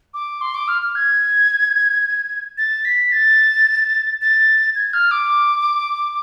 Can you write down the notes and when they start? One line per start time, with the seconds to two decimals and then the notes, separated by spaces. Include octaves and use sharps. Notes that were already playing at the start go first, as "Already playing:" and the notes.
0.14 D6
0.41 C6
0.55 D6
0.68 F6
0.82 F6
0.95 G#6
2.58 A6
2.85 B6
3.12 A6
4.21 A6
4.75 G#6
4.93 F6
5.11 D6